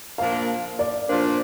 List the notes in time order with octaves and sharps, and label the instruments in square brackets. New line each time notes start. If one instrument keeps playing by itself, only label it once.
[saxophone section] A#2 F3 A#3 D4 F4 [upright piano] F5
[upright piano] D5
[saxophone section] A#2 F3 A#3 D4 F4 [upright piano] C5